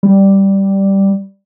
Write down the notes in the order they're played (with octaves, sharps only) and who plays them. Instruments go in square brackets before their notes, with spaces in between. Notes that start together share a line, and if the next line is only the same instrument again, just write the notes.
[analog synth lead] G3